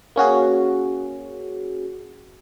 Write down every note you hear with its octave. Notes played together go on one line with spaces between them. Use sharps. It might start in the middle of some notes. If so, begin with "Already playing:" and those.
A#3 C#4 F#4 G#4